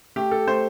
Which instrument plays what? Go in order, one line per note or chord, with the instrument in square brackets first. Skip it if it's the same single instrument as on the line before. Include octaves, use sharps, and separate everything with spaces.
[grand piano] A3 G4
A4
A3 C5